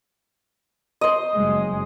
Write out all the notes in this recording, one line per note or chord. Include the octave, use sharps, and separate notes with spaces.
C5 D#5
F#1 G#3